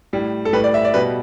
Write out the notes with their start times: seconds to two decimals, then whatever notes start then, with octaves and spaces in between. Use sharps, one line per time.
0.13 A2 G3
0.45 A4
0.53 A2 G3 B4
0.64 D5
0.74 E5
0.85 D5
0.94 B2 G3 B4